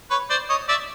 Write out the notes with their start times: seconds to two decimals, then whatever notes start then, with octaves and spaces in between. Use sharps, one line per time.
0.11 B4 C#5
0.30 C5 D5
0.50 C#5 D#5
0.69 D5 E5